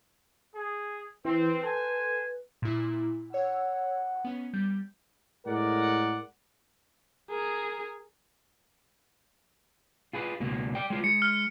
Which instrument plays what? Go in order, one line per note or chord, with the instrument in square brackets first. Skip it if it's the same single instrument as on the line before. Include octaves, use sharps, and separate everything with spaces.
[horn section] G#4
[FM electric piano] E3 [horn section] C4 [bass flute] B4
[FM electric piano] A4 [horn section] C5 G#5
[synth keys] A#2 E4
[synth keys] C#5 E6 [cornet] F#5
[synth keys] B3 C#4
G3 G6
[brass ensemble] A2 G#3 A#4 D5 F#5
[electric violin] G#4 A#4
[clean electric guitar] F4 G#4 B4
C#2 B2 A#3
D5 G5
G#3 F4
[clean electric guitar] G#3 [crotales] C#7
[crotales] F6